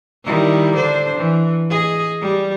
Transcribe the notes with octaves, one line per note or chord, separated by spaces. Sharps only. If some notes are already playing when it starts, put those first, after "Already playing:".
D#3 G3 E4
D3 D4 C5
E3
G#4 D#5
G3